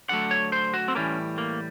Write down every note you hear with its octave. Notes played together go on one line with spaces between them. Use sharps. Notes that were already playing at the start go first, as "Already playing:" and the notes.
D3 F#3 A3 F#5
C#5
C5
F#4
C4
A2 E3 G3 A#3 C#4
A#3